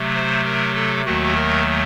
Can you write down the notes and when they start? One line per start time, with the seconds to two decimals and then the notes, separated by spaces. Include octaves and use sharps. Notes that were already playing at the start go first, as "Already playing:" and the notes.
Already playing: C3 F#3 A3
0.14 C5
0.44 A#4
0.74 A4
1.05 D#2 D#3 F#3 A3 F#4
1.35 A#4